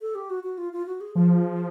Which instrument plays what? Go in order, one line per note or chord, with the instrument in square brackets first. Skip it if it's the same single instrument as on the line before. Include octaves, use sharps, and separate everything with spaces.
[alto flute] A4
G4
F#4
F#4
F4
F4
F#4
G#4
[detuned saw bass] F3 [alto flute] G#4